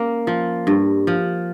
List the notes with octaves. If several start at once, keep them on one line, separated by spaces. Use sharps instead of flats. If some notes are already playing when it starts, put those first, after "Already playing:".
Already playing: A#3 C#4
F3
G2
F3